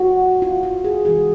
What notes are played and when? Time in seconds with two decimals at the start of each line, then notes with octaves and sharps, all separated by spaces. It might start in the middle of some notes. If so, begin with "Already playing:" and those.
Already playing: F#4
0.42 F4
0.63 F#4
0.84 G#4
1.05 C3 E3 G#3 G#4